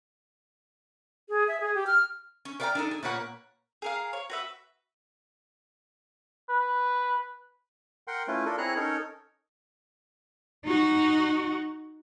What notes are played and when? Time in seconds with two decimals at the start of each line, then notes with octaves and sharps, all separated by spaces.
1.29 G#4
1.48 E5
1.61 G#4
1.75 G4
1.87 F6
2.45 C#4
2.60 A#4 B4 D5 F5 G5 A#5
2.75 D4 D#4 A4
2.91 G#4
3.03 A#2 A#3 B4 C#5 F#5
3.82 G#4 A#4 F5
4.13 C#5
4.30 F#4 B4 E5
6.50 B4
8.08 A#4 F#5 G5 C6
8.28 A3 C#4 E4 F4 B4
8.46 D4 F4 A4 A#4
8.58 C4 E4 G#4 C#5 A#5 F#6
8.76 C#4 D#4 A4 A#4 C#5
10.65 D#4 F#4